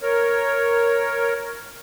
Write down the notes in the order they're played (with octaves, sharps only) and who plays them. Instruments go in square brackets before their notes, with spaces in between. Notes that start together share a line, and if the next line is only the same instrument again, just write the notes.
[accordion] A#4 C#5